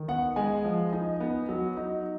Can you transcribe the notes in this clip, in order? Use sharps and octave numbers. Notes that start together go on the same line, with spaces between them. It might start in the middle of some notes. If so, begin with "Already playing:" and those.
Already playing: D#3
B3 F#5
G#3 G#5
F3
D#4
B3
F#3
D#4